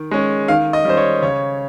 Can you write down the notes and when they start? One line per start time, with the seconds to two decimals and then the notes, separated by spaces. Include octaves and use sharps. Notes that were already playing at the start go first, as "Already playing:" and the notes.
Already playing: D#3
0.11 G#3 C#4
0.48 D#3 F5
0.73 D#5
0.85 G3 C#4 C5
0.97 C#5
1.22 C#3 C#5